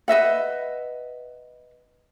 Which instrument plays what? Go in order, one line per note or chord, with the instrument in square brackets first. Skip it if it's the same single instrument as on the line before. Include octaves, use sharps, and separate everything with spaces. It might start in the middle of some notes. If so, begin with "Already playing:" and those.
[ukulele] B4 D#5 E5 F#5